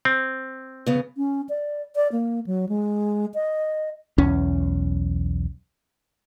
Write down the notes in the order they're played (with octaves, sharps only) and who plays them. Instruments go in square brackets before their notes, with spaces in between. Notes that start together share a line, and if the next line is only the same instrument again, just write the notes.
[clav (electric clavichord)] C4
[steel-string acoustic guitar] C#3 B3
[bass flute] C#4
D5
D5
A#3
F#3
G#3
D#5
[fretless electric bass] B1 E2 C#4